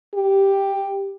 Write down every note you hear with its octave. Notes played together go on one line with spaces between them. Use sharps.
G4